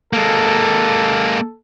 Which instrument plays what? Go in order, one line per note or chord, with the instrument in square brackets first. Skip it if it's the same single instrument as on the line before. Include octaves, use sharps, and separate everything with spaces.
[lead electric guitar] G#3 A#3 [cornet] A4